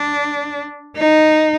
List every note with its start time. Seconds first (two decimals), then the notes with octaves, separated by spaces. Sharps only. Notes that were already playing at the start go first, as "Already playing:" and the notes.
Already playing: D4
0.97 D#4